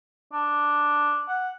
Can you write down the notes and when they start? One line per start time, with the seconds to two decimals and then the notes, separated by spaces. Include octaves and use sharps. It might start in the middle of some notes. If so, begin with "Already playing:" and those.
0.33 D4
1.29 F#5